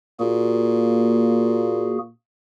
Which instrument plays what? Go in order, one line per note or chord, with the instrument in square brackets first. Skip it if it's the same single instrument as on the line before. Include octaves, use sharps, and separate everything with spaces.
[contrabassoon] A#2 [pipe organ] A#3 F#4 G#4